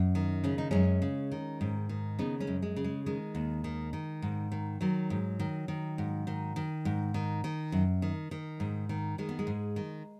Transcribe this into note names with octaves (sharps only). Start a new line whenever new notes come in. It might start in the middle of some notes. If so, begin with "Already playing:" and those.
Already playing: F#2
D#3
C#3 C#4
D#4
F#2 G#3 C#4
C#3
D#3
G#2
D#3
C#3 B3 D#4
G#3 C#4
F#2
G#3
C#3
G#3
D#3 G#3
D#2
D#3
D#3
G#2
D#3
D#3 F#3
G#2
D#3
D#3
G#2
D#3
D#3
G#2
D#3
D#3
F#2
D#3
D#3
G#2
D#3
D#3 G#3
B3
G#3
G#2
D#3